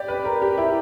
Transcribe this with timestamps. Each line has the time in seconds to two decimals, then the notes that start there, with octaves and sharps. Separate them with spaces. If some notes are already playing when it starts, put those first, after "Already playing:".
Already playing: G4 D5
0.08 B4
0.24 A#4
0.42 G4
0.58 E4